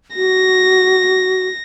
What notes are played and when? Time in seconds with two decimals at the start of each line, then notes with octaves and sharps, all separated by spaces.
0.16 F#4 A#6